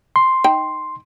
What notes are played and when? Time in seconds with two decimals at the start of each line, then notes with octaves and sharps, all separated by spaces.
0.16 C6
0.44 D#4 G5